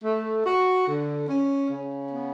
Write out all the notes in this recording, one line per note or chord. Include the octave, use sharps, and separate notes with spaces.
A3
F#4
D3
C#4
C#3
B3